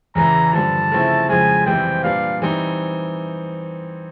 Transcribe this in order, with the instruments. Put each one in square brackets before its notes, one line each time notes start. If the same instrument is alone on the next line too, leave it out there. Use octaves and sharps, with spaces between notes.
[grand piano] E2 C#3 E3 [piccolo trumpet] A#5
[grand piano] G2 D3 F3 [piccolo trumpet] A5
[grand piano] C#3 F3 A3 C4 E4
[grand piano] F2 C#3 F3 G#3 [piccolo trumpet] G#5
[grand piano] F2 C3 E3 G3 C4 [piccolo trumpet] G5
[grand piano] A#2 G3 B3 D4 [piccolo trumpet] F5
[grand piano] E3 G3 C4 D#4